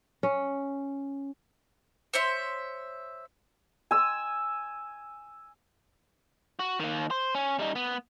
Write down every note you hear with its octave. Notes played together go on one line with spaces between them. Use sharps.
C#4
C5 C#5 E5 C6
G#5 E6
F#4
D#3 A#3
C5
C#4
G3 D#4
B3